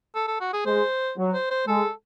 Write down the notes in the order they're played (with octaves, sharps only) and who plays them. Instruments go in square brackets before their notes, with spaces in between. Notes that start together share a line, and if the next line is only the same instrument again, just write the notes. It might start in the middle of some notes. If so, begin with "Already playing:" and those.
[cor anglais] A4
A4
F#4
G#4
[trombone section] G#3 [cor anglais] C5
[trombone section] F#3
[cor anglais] C5
C5
[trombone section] G#3 [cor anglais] A4